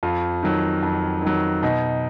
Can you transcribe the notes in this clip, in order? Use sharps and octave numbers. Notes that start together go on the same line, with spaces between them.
F2 F4
D#3 F#3
F2
D#3 F#3
B2 D#4